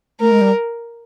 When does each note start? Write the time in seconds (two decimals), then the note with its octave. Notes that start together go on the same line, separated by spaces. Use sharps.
0.20 A3 A#4
0.31 G#3
0.41 G3